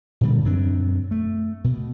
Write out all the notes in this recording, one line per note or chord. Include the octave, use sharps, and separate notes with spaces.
A#2 D3 E3 G3
F#2 F#3 C4 D4
A3
B2